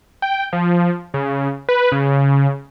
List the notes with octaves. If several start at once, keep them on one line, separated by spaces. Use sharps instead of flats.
G5
F3
C#3
B4
C#3